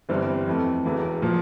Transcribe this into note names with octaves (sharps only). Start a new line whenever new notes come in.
G1 G2 E3 G3 C4
F2 E3 A3
E1 E2 E3 A3
A#2 F3